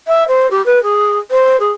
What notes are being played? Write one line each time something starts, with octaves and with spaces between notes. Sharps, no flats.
E5
C5
G4
B4
G#4
C5
G#4